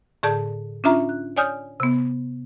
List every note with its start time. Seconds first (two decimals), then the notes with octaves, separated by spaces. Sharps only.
0.23 A2 D3 G#4 D5 A5 G6
0.84 C#4 D4 F4 E5 A#5
1.09 F#6
1.36 C#5 D5 G#5 D#6 F6 G6
1.80 C3 B3